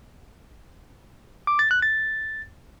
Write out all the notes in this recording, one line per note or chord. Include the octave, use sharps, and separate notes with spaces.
D6
A6
F#6
A6